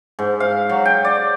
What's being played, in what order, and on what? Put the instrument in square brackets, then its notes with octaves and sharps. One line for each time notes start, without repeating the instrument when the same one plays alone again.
[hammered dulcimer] G#2
F5
F#3
G5
D5